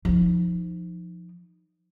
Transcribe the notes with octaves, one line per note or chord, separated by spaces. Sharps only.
F3 D#4